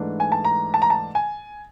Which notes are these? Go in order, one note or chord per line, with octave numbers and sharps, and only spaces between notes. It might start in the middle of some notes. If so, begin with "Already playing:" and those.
Already playing: G#2 E3 A3 D4
G#5
A5
A#5
A5
A#5
A5
G#5